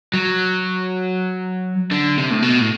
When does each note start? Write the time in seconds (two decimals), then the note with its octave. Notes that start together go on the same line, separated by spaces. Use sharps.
0.14 F#3
1.92 D3
2.18 C3
2.31 A2
2.42 B2
2.61 A2